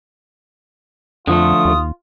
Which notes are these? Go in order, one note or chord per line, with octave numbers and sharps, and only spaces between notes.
F2 D3 F3 A3 F4 D#6
D#2